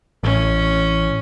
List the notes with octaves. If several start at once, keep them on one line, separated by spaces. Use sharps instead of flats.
A1 C#4